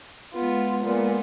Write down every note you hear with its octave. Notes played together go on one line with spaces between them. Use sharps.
G#3 B3 F4
A#2 G#3 B3